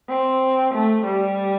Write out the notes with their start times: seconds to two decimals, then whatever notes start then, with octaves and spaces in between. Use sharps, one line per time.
0.09 C4
0.74 A3
1.06 G3